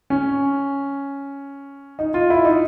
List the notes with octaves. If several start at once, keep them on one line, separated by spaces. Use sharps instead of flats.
C#4
D#4
F4
E4
D#4